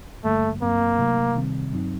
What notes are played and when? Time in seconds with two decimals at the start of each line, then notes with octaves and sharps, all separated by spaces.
0.24 G2 D3 G3 A3 A#3
0.62 G2 F#3 A3 A#3 C4
0.99 C3 F#3 A3 D#4
1.35 C3 D#3 G3 C4
1.73 G2 F#3 C4 D#4